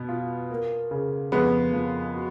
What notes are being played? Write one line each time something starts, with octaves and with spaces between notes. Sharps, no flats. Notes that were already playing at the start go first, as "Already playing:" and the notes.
Already playing: B2 B3
F4
A#3
C#3
F2 G#3 B3
F3
F#4